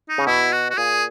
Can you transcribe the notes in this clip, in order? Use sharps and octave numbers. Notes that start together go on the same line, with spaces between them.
D#4
C#3
B2 E4
F#4
F#4
A#2 G#4